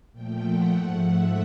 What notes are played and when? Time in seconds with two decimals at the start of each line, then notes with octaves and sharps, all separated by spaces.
0.12 A#2 F3 A3 G5
0.43 F#5
0.75 G#2 F3 A3 F#5
1.06 E5